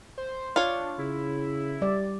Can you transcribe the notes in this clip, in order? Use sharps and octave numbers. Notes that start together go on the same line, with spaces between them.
C5
D4 F4 C#5
C#3 E4
G3 D5